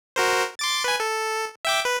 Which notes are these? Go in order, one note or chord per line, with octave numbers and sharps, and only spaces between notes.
F#4 A#4 C5
C6 D6 A6
B4 G#5
A4
E5 G5 D6
B4